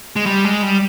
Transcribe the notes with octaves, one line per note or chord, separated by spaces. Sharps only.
G#3
G3
G#3
G3